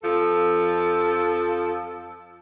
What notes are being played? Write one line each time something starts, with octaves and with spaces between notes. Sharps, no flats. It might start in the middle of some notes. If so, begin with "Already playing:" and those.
F2 F3 A4